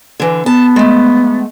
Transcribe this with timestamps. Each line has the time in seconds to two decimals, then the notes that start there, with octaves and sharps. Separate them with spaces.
0.20 D3 E3
0.46 B3 A5
0.76 G#3 A3